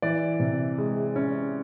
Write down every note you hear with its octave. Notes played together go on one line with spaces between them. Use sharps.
E3 D5
C3
G#3
C#4